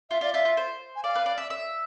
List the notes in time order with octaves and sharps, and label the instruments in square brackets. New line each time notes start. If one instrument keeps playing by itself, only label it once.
[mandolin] F4 [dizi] E5
[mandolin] F4 [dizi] D5
[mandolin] F4 [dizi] E5
[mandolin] F4
C5
[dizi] G#5
[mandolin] D5 [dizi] F5
[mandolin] B4
D5
E5
E5